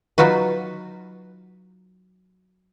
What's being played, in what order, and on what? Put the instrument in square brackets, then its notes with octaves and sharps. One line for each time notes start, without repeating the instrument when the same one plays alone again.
[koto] F#3 D#4 F4 F#4 B4